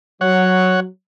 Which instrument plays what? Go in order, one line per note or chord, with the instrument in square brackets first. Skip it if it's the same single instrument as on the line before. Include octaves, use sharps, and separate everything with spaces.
[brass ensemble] F#3 [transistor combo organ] C#5 F#5